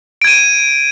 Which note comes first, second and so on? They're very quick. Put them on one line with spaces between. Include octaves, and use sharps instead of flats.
D7 G#6 D#7